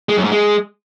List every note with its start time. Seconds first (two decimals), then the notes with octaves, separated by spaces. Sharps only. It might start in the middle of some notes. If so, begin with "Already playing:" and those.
0.09 G#3
0.17 F#2
0.24 G#2
0.32 G#3